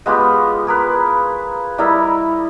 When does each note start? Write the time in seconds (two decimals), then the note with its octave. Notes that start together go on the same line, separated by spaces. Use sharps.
0.06 G#3 B3 F4 G4
0.67 G#4 A#4 B4
1.78 G3 E4 A#4 D#5